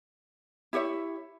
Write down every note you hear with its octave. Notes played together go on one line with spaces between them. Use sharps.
E4 G4 C#5 E5